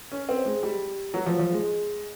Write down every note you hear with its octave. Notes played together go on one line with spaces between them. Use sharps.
C#4
C4
G#3
G3
F#3
F3
F3
G#3